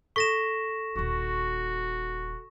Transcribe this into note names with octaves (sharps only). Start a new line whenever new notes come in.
A4 C#6 A#6 B6 E7
D#1 D#4 F#4